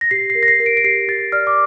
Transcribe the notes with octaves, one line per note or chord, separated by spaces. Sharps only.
A#6
G4 C7
C7
A#4
A#6
C7
A#4
D7
D7
G4 C7
G4 A6
D5 F6
D6